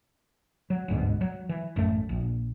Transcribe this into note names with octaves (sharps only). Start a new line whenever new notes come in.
F#3
G1 D2 G#2 B2
F#3
E3
A1 F#2 A3
A#1